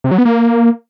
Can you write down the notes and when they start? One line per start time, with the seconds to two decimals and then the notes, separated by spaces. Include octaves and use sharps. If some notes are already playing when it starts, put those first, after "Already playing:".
0.04 C3
0.11 F#3
0.18 B3
0.25 A#3